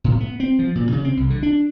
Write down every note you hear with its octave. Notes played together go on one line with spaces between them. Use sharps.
A2
B3
C4
F3
A#2
C#3
C4
C2
D3
D4